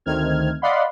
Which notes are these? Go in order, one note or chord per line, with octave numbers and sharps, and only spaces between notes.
D2 D#3 A3 C4 F6 G#6
D5 D#5 F5 F#5 B5 C6